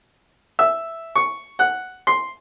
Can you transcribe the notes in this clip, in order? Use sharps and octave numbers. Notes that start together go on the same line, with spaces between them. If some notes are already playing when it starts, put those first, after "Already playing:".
E5
C#6
F#5
C6